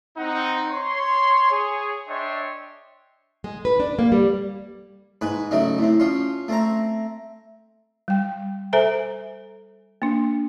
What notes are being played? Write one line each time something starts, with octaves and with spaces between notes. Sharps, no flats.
C4 D#4 F#5
C#5 C6
G#4 C#5
D4 C#5 D#5 E5 G5 C6
G#3
B4
D4
A#3
G3
G#2 B4 G#5
C#3 F#3 A3 D#4
A2 C4
F3 C#4 C6
A3 C4 A#5
G3 G5
A4 C5 E5 G#5 A#5
A#3 D4